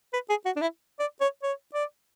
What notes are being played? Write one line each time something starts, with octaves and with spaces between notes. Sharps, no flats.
B4
G#4
F#4
D4
E4
D5
C#5
C#5
D5